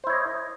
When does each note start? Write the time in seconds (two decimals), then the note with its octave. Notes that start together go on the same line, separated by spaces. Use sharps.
0.04 C5
0.07 E4
0.10 C#5
0.13 D#5